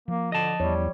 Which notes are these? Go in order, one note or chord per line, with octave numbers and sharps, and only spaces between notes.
F3 A#3
D3 D#5 A5
E2 G3 C#5